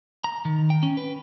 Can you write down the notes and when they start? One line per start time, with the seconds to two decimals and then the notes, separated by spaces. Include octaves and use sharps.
0.24 A#5
0.45 D#3
0.70 G5
0.83 C#4
0.97 B4